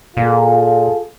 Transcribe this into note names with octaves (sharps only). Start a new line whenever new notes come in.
A#2 F4 G#4 A4